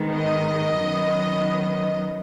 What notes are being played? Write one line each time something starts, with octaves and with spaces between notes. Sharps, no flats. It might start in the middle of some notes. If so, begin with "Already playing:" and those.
Already playing: G#2 D#3 G#3 B3
D#5
F#2 D#3 F#3 B3